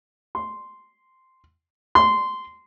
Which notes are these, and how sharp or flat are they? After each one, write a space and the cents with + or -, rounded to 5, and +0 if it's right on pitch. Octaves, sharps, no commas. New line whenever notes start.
C6 -5
C6 -15